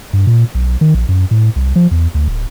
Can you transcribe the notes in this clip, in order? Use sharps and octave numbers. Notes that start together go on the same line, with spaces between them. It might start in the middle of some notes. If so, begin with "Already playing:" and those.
G2
A#2
B1
D#3
A#1
F#2
A2
C2
F3
E2
D2
D1